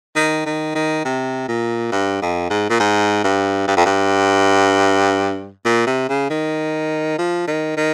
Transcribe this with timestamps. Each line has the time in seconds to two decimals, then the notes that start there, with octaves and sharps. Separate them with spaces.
0.16 D#3
0.46 D#3
0.75 D#3
1.05 C3
1.48 A#2
1.92 G2
2.22 F2
2.50 G#2
2.70 A#2
2.80 G#2
3.24 G2
3.68 G2
3.77 F2
3.86 G2
5.65 A#2
5.87 C3
6.09 C#3
6.30 D#3
7.19 F3
7.48 D#3
7.77 D#3